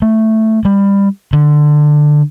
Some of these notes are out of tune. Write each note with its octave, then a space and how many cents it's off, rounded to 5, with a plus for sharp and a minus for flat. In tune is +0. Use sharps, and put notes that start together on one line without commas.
A3 +0
G3 +20
D3 +15